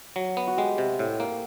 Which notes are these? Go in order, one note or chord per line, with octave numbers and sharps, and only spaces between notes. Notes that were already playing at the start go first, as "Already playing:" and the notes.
F#3
B3
F#4
G#3 G4
C3
A2
A#3